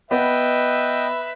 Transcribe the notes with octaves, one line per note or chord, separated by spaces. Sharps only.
B3 B4 D#5 E5 G5